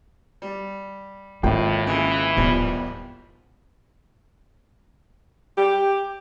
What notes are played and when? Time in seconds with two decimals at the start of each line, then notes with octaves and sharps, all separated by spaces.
0.42 G3
1.43 G#1 A2 A#3 F4 G5
1.87 D#2 C#3 E3 G#3
2.37 D1 E2 F3 G3
5.57 G4